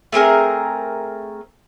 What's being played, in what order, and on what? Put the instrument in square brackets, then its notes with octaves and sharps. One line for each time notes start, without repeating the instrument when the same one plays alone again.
[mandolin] A3 C4 G#4 A#4